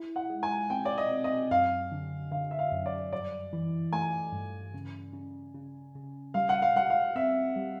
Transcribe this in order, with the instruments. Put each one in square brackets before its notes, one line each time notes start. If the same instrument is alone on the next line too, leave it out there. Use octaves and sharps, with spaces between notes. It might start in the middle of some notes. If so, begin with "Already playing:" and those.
Already playing: [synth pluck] E4
[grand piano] F#5
[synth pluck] G#3
[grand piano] G#5
[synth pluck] C4 [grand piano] G5
[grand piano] D5
D#5
[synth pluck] C4
[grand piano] D#5
[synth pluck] F#2 [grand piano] F5
[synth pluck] D3
[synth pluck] D3 [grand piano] F5
[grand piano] E5
F5
[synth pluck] F#2
[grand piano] D5
[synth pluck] G2 [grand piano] D5
[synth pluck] E3
[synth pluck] A3 [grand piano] G#5
[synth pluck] G2
C#3
C#3
C#3
C#3
[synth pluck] G3 [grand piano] F5
[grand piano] F#5
F5
[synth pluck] G3 [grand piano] F#5
[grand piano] F5
[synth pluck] C4 [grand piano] E5
[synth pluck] G3